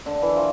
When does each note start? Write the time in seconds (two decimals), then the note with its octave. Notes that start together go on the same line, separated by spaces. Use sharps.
0.06 D3
0.22 E3
0.37 F3